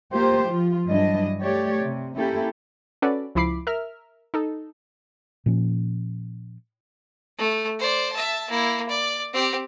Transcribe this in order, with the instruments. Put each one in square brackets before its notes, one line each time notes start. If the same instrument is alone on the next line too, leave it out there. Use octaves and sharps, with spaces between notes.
[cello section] A#3 F4 G4 C5
F3 F4
G2 E3 F#3 G3 D4 D#5
A3 G4 C#5 D5
C3
A#3 C#4 E4 G4 A4
[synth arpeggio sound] C#4 F#4 A4 B4 D5
C#2 F3 E4 B5 D6 C7
A#4 E5 F6
D#4 A4
[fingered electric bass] A#2 F3 C#4
[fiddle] A3
C5 D5
E5 A5
A#3 E4
D5
C4 G4